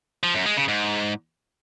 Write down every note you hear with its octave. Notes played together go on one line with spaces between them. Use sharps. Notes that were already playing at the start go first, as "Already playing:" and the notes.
F3
F#2
G#3
C#3
G#2